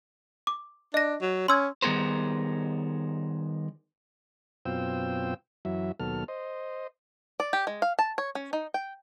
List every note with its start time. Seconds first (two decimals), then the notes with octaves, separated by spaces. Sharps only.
0.47 D6
0.94 D4 D#5 A#6
1.21 F#3
1.48 C#4 C6 E6 G#6
1.82 D#3 G3 B3 G#4 A#4 C5
4.65 F#2 B2 C4 F4 G5 E6
5.65 F#2 E3 F#3 E5
6.00 D#2 B2 F#3 A4 F6
6.28 C5 D#5
7.40 D5
7.53 G4
7.67 G#3
7.82 F5
7.99 A5
8.18 C#5
8.35 C#4
8.53 D#4
8.74 G5